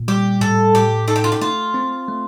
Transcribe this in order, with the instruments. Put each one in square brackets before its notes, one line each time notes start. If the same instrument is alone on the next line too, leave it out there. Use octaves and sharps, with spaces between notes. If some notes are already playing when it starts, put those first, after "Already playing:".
Already playing: [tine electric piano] A#2
[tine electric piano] G3 [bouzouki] G4
[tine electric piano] A2 [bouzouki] A4
[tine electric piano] A2 [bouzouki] G4
[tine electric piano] D#4 [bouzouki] A4
[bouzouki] G4
F4
G4
[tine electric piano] A3 [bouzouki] F4
[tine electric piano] C4
A3